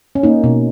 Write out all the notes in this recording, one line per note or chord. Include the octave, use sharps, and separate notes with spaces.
C#4
A#3 D#4
B2